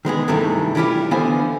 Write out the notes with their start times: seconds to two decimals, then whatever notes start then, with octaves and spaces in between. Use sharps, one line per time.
0.05 D#3 G#3 B3 G#4
0.28 G2 C3 D#3 E3 G#3 A3
0.75 E3 G3 E4 F4 G4
1.11 D3 E3 B3 C5 F5 G#5